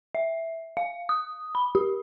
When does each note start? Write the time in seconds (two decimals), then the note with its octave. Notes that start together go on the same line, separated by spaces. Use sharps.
0.15 E5
0.77 F5
1.09 D#6
1.55 B5
1.75 G4